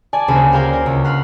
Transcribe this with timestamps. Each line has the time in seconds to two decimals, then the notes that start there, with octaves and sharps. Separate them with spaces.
0.13 D5 G#5 A5
0.28 D2 C#3 A#3 G#4 C5 B5
0.52 G#4 A#4 D5 F5 G5 C6
0.73 A#4
0.86 C#2
1.04 F#5 B5 C6 F6